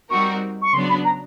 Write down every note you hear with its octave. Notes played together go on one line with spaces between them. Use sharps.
G3 C4 D#4 F#4 A#4 C#6
C#6
C#3 F#3 B3 D4 C6
B5
A#5